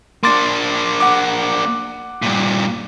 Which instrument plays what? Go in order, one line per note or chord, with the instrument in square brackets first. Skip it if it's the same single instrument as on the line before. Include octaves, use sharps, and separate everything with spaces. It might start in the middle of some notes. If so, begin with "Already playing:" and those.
[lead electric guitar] A#3 D4 [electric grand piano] C6 D6 A6
[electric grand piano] F#5 D6
[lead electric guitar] G2 A#2